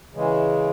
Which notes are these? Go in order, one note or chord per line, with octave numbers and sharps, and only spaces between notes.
C#3 E3 G#3